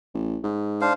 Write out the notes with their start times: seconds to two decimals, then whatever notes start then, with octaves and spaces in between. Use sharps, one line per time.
0.14 A1
0.44 G#2
0.81 D4 C5 F5